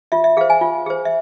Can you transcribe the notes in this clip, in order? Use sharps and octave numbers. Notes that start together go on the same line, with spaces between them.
F4 E5
E5
G#4 C5 F5
G#5
F4
G#4 C5
E5